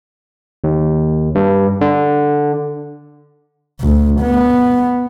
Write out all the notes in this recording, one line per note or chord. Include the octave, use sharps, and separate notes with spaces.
D#2
G2
D3
D2
B3